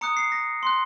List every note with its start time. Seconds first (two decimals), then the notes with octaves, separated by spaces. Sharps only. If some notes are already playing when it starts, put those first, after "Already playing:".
0.01 A#5 D#6 F#6 C#7
0.17 C7
0.32 A#6
0.63 C6 F#6